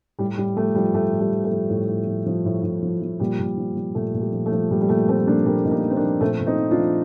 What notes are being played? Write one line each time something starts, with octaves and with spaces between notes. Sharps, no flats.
A2 G3
A2 G3
F3 A3
F3 G3
A2 A3
A2
G3
F3
A3
F3
A2
A2
F3
F3
A2
A2
F3
F3
A#2 G3
A#2
F3
F3
A#2 A3
A#2
G3
F3
A3
F3
A#2 G3
G3
A#2 A3
F3 A3 C4
F3 A#3 D4
A#2 G3 A#3
A#2 D#4
A#3 D4
F3
C4
A#3 D4
F3
A#2 A3 C4
A#2
C4 D#4
F3
D4 F4
F3